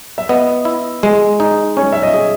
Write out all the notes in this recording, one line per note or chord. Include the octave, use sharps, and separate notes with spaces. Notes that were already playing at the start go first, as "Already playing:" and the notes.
E5
B3 D#5
E4
G#3
D#4
C#4 C#5
E5
D#5
G#4